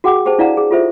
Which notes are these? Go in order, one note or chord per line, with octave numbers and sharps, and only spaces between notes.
F#4 G#4 F#5 G5 D6
G4 G#4 C5 G5 A5
D4 E4 D5 F5 F#5 A#5
G#4
F4 G4 A4 C5 E5